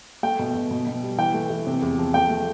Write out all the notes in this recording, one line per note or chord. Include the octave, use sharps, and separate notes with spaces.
A3 G5
B2
B2
B2
B2
G3
E3 G5
A3
E3
C3
E2
F3
A3 G5
A3